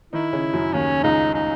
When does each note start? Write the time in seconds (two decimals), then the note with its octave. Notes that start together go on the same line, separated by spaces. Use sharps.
0.13 D#3 D#4 E4
0.33 C#3 C#4
0.53 F#2 F#3
0.74 D#2 D#3 C#4
1.04 C#2 C#3 D#4
1.35 D#4